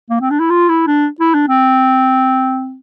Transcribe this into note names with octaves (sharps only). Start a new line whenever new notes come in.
A#3
C4
D4
E4
F4
E4
D4
E4
D4
C4